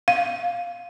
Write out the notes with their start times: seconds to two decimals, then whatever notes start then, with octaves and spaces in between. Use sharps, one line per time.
0.08 F5